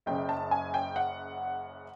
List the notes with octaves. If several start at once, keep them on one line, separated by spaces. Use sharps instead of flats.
F#1 F#2 C#3 G5
A5
G#5
G5
F#5